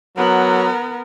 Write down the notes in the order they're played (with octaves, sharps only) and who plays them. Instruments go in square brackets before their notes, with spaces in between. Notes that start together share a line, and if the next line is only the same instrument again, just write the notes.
[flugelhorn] F#3 [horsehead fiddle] B3 A#4